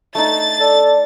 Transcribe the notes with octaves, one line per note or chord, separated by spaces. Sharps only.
A3 D4 D#4 A6
A4 D5